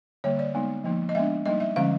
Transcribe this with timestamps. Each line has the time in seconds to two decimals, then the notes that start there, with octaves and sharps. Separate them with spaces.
0.24 D3 G3 A#3 C#5
0.39 D5
0.54 G#3 B3 D#4
0.84 F3 A#3 D#4
1.09 D#5
1.15 G#3 B3 D4 E5
1.46 G3 A#3 D#4 D#5
1.60 E5
1.76 D3 F3 G#3 C#4 F5